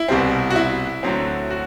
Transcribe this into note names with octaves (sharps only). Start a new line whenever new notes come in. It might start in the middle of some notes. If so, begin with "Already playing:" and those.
Already playing: E4
C2 B2 G3 C4
F#4
E4
D2 D3 F#3 C4
F#4